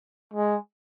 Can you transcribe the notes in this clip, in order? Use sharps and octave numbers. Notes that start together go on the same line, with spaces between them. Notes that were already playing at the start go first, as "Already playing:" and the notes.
G#3